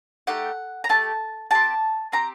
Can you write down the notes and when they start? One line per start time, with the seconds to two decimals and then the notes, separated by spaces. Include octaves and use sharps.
0.27 A3 D#4 G4 F#5
0.84 A#5
0.89 A3 D#4 G4 A5
1.51 C4 G4 A5
2.12 C4 G4 A#5